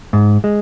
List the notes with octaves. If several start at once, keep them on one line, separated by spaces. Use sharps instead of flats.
G#2
G#3